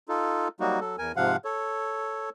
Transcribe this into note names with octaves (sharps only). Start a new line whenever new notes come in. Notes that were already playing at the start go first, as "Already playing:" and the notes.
D#4 F4 A4
F#3 G3 A#3 D#4 F#4
F#3 A4
E2 A#4 G#5
G#2 C3 F3 F5 F#5
A4 C#5